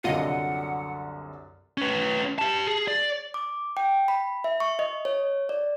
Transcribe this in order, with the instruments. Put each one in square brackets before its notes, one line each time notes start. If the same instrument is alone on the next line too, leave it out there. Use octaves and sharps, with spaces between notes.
[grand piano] C2 F#2 D3 [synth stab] F4 D#5 [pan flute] F#5
[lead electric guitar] C#4 B4
G4 A5
G#4
D5
[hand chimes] D6
G5
B5
E5
C#6
D#5
C#5
D5